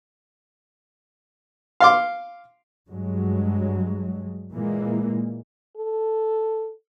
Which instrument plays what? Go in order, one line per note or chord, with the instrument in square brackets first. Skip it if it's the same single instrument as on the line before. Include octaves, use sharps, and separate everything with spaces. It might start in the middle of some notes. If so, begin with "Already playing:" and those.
[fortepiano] F5 C6 D6
[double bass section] G2 F#3 G#3
A#2 E3 G#3 A#3
[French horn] A4